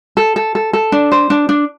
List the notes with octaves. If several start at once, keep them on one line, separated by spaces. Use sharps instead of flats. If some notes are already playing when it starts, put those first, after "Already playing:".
A4
A4
A4
A4
D4
C5
D4
D4